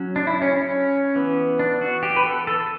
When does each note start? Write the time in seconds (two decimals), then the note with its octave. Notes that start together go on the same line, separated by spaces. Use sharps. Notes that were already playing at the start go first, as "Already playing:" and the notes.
Already playing: F#3 C#4
0.16 D4
0.27 E4
0.42 C#4
0.56 C#4
1.16 E3 B3
1.59 D4
1.81 F#4
2.03 G4
2.16 B4
2.25 A4
2.47 A4